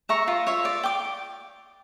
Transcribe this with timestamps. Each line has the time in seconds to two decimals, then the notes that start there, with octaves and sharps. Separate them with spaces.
0.09 E5 A#5 C#6
0.28 F4
0.47 C#5 E5
0.65 D5
0.83 G5 D6